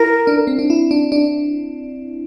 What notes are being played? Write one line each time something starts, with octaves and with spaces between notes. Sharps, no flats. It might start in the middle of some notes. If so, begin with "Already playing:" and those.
Already playing: E4 A#4
D4
C4
D4
E4
D4
D4